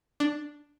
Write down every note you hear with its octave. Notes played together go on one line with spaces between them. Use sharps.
D4